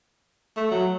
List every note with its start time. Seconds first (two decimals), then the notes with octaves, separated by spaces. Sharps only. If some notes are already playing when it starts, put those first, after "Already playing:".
0.57 A3
0.71 F#3